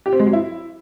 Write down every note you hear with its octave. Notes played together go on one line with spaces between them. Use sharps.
G4
C4
G#3
F#3
E4